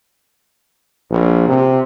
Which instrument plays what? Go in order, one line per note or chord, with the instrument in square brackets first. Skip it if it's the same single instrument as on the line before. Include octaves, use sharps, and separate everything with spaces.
[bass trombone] A#1
C3